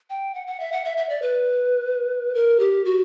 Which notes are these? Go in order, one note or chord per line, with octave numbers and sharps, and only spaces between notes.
G5
F#5
F#5
E5
F#5
E5
E5
D5
B4
A#4
G4
F#4